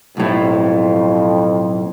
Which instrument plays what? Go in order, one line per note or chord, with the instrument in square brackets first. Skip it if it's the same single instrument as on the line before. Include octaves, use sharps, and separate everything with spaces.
[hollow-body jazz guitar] B1 A2 [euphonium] F2